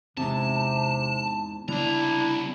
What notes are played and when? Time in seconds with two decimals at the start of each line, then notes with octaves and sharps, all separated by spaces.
0.17 E2 G#2 C3 C4 A5
1.68 C2 C#3 G3 B3 D4 E4 A#5